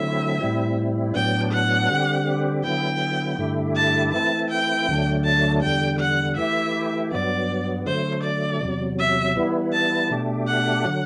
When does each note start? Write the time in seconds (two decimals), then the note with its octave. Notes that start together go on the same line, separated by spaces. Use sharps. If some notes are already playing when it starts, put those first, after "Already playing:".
Already playing: D3 F#3 A3 C4 E4 E5
0.40 A2 G3 C4 E4
1.14 A2 F#3 B3 D4 G5
1.52 F#5
1.89 D3 G3 C4 G4
2.63 D3 F#3 B3 E4 G5
3.39 G2 D3 A3 E4 G4
3.76 A5
4.13 E3 A3 C4 E4 A5
4.51 G5
4.88 D2 D3 F#3 A3 D4
5.25 A5
5.62 E2 D3 G3 G5
5.99 F#5
6.37 E3 A3 E4 G4 E5
7.12 G2 F#3 B3 D5
7.86 D3 F#3 A3 C5
8.24 D5
8.61 E2 C3 F#3
8.99 E5
9.36 E3 G3 B3 E4
9.73 A5
10.11 B2 A3 D4 G4
10.47 F#5
10.85 D3 F#3